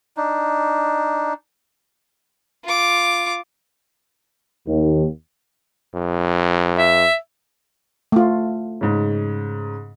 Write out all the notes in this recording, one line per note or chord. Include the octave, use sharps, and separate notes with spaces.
D4 D#4
F4 D6
D#2
F2
E5
A3 F4
G#2 C#3